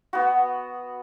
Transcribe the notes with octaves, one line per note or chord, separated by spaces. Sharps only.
B3 F#4